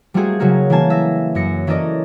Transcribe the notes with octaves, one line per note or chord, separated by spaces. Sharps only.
G3 A3 A#3 C4 F#4 G#4
C#3 F#3 C#4 F#4 A#4
E3 G3 A#3 G#5 A5
E5 A#6
F#2 F#4 A#6 C#7
E3 C#4 A4 A#4 D5 D#5